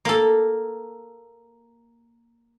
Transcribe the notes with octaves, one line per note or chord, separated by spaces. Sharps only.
A#3 A4